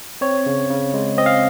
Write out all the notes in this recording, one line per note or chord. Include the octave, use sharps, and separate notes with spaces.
C4 C#5
C#3
C#3
G#3
C4 D#5
F5